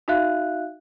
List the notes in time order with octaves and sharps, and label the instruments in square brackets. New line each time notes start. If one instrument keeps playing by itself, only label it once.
[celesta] D#4 F#4 E5 F5 F#6